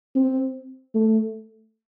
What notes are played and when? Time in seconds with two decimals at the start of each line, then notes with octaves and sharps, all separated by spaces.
0.15 C4
0.94 A3